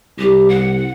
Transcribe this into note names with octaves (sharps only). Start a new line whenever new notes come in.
C2 G4
F#5